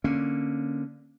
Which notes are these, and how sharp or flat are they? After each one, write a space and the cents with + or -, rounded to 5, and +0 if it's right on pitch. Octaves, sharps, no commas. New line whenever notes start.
D3 +0 A#3 +0 C#4 -15